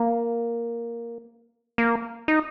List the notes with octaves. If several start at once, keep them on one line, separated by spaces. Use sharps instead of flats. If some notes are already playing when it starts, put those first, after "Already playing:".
Already playing: A#3
A#3
D#4